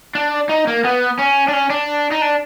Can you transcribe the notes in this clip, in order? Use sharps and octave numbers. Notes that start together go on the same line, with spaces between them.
D4
D#4
A#3
B3
C#4
D4
C#4
D4
D#4
D4